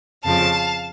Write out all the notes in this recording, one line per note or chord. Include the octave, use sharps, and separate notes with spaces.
F2 C#3 F3 F5 A5